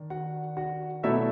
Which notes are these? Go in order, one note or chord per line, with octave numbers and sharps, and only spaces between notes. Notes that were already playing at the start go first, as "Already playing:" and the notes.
Already playing: D#3 D4
F#4 F#5
F#4 F#5
B2 F#3 A3 D4 E4 E5